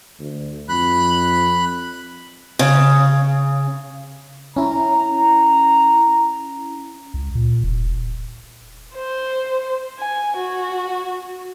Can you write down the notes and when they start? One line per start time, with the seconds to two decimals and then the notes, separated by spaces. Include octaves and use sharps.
0.19 D2
0.69 F2 B5 F#6
2.59 C#3
4.56 C#4 E4 A#5
7.14 C#2
7.35 A#2
7.64 E1
8.94 C5
9.99 G#5
10.36 F#4